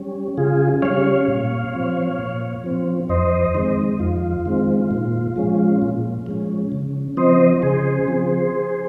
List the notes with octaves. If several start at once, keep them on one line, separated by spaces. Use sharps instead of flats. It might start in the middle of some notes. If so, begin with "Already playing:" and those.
Already playing: G3 C#4
C#3 F4 G#4
G3 C#4 C#5 F5
A#2
F3 C4
A#2
F3 C4
F2 C5 D#5
D#3 G#3 C4
F2 F4
D#3 G#3 C4
A#2
F3 G#3 C#4
A#2
F3 G#3 C#4
C#3
F3 C4 C5 D#5
C#3 G#4 C5
F3 C4